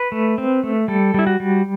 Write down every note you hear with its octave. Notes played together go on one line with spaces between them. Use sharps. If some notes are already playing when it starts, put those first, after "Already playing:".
Already playing: B4
A3
C4
A3
G3 A4
G3 E4
F#4
G3